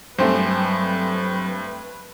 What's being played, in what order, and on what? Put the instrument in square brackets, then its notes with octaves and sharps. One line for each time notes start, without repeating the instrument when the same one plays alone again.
[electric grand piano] G2 [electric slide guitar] F#3 G#5 [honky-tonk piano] A3 C4 C5 [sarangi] B4